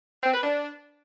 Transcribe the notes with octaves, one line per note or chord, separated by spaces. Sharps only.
C4
B4
D4